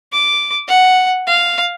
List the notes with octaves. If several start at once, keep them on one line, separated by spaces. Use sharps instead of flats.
D6
F#5
F5